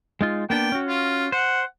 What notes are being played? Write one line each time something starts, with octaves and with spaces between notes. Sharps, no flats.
G#3 D#4 F4
A#3 B3 D4 G5
C#4 F#4
F4
C5 F#5